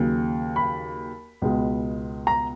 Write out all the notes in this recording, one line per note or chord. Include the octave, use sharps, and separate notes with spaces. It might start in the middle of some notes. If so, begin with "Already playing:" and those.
Already playing: D#2 C#3 F#3
B5
C#2 B2 G#3
A#5